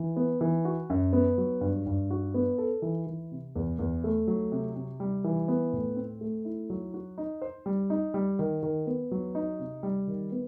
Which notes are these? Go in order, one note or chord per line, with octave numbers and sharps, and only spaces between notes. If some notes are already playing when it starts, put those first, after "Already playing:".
Already playing: E3
B3
E3
F#4
F#2
B3
F#3
G2
G2
F#4
B3
A4
E3
E3
C3
E2
E2
A3
F#3
C3
C3
G3
E3
B3
A2
C4
A3
E4
F#3
F#4
D#4
C5
G3
D#4
G3
D#3
D#3
B3
F#3
D#4
C3
G3
D#3
B3